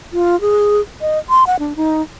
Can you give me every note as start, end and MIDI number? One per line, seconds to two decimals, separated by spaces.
0.13 0.39 65
0.41 0.81 68
1.01 1.19 75
1.29 1.46 84
1.47 1.56 78
1.59 1.73 62
1.76 2.02 63